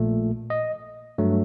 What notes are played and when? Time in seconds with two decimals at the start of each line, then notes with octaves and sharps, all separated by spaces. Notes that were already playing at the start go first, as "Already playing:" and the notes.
Already playing: A#1 A#2 A3
0.50 D#5
1.18 G2 F#3 A3